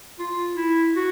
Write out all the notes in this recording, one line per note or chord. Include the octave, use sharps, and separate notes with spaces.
F4
E4
F#4